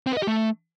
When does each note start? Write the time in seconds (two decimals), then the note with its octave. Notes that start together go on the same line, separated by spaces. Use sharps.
0.07 C4
0.12 B4
0.17 D#5
0.22 G4
0.27 A3